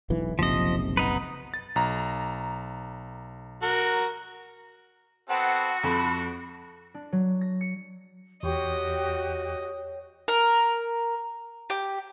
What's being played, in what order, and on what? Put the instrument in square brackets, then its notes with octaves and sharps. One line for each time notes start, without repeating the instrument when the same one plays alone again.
[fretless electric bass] E1 B1 E3
[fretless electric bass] F#1 B1 C3 [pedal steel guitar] F3 D#5
[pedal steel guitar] B3 D#4 B4
[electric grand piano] A6
B1 A#5
[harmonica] F#4 A#4
[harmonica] B3 C4 A4 [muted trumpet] F#4 [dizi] F#5
[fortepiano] F2 [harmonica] A4 [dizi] B5
[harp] D4
F#3
A#6
C#7
[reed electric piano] E2 [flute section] F#4 G4 [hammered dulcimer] C5 C#5 G5 [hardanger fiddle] D#5
[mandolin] A#4
G4